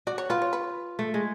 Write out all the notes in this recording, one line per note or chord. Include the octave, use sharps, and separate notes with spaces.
F#4 D5
C#5
F4 B4
C#5
B4
A3
G#3